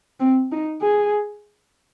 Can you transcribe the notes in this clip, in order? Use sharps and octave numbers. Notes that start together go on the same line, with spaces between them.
C4
D#4
G#4